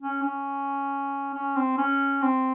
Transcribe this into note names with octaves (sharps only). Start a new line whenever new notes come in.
C#4
C#4
C#4
C4
C#4
C4